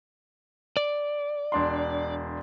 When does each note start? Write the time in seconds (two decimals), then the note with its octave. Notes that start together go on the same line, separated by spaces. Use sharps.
0.77 D5
1.52 E1 D4 C6